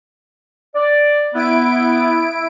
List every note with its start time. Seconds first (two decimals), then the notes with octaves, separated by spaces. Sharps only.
0.75 D5
1.35 B3 E4 D7